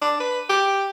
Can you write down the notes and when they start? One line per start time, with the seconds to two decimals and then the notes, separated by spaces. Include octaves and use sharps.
0.02 D4
0.20 B4
0.49 G4